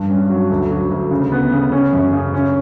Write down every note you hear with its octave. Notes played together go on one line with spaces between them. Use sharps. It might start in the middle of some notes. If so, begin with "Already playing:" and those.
Already playing: G2
C#4
F#3
D2
F#3
D2
C#3
B3
C#3
C#4
F#2
C#3
C#4